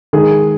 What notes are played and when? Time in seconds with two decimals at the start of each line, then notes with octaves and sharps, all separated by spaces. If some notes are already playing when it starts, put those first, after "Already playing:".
0.13 D#3 G#3 G#4